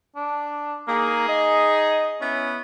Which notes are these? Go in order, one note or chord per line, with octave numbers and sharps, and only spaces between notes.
D4
A#3 D#4 G#4
D#5
B3 C#4 E4